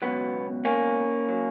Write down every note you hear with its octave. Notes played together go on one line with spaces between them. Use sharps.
C#2 B2 F#3 B3
A#3 C#4
F#3